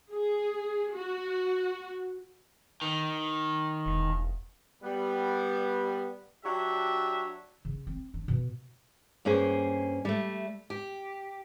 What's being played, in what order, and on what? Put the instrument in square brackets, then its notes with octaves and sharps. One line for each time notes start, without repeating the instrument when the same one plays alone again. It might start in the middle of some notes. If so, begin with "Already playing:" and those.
[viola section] G#4
F#4
[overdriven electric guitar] D#3
[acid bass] E1
[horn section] G3 B3
F#3 D4 G4 C#5 E5
[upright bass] C#3
C4
D4
B2
[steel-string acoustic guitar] G2 A#3 C#4 G#4 C5
G3 A3
G4